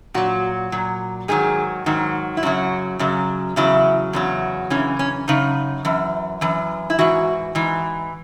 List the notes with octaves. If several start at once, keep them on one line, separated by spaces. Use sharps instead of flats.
A#2 F#3 F#4
A#2 F#3
G#2 D#3 F#3 G#4
G#2 D#3 F#3
E4
F#2 C#3 F#3 F#4
F#2 C#3 F#3
E2 C#3 F#3 E4
E2 C#3 F#3
F#2 C#3 E3 C#4
C#4
F#2 C#3 D#4
F#2 E3
F#2 E3
E4
G#2 E3 F#4
G#2 E3